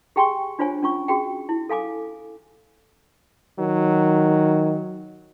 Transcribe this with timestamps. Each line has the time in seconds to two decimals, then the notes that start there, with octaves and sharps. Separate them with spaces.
0.16 G4 G#4 G5 G#5 C6 C#6
0.59 D4 F4 C5 C#5 G#5
0.83 C#4 F4 C#6
1.08 F#4 G#4 G5
1.49 E4
1.70 A4 F5 G#5 D6
3.59 D#3 F#3